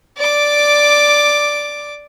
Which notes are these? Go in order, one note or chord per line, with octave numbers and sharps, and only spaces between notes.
D5 D6